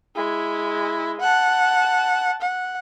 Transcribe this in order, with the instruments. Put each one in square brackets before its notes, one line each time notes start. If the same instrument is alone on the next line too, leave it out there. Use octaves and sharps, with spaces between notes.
[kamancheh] G#3 E4
F#5 A5
F#5